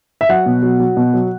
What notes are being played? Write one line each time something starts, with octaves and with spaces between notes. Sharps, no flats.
E5
F#3 F#5
B2
F#3
F#3
B2
F#3